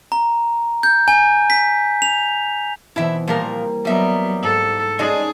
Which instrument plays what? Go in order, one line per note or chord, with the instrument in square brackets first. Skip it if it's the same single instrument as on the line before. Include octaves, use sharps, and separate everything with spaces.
[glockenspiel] A#5
G6
G#5
B6
F7
[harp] B2 E3 C4 [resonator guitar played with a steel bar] E4 E5
[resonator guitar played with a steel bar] A#2 F3 A#4 [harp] G3 A#3
[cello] F#3 B3 [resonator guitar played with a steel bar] G3 E5 [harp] D#5 A#5
[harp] G#2 [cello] A4
[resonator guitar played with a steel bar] G#3 D5 [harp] C#4 D#4 A5 [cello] G#4